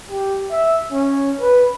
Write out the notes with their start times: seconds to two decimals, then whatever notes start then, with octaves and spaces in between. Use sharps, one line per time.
0.10 G4
0.51 E5
0.92 C#4
1.41 B4